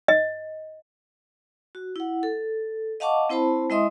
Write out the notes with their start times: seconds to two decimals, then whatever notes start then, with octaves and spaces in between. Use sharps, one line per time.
0.08 D#5
1.75 F#4
1.96 E4 F#5
2.23 A4
3.00 D#5 F5 F#5 A5 C#6 D6
3.29 C4 E4 C5 A5 B5
3.70 G#3 E4 D#5 E5 C6 D#6